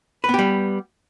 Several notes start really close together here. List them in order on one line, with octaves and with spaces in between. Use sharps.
B4 B3 G4 G3